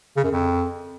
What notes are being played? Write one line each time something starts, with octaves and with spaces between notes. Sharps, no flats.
C#3
F#2
F2